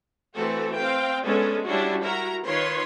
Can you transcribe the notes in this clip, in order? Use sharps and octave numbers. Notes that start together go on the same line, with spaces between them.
E3 A3 C4 F#4 A4
C4 F5 G5
G#3 B3 C#4 D4 A4
G3 C#4 D4 E4 F#4
E4 F#4 A#4 A#5
D#3 F4 B4 C#5 C6